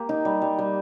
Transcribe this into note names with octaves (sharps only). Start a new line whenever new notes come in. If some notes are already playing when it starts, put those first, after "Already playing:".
Already playing: A#3 G4
D#4
G3
G3
G3